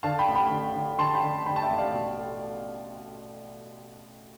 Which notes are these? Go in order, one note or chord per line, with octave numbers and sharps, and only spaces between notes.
D3 F5 A5
G5 B5
A1
G5 B5
D3
D3
D3 A5 C6
G5 B5
D3
D3 G5 B5
A5
E5 G5
A1
D5 F5
B2
A3